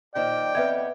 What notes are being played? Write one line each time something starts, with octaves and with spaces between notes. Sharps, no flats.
A#2 D#3 F3 D5 G5
F2 B3 B4 E5 G#6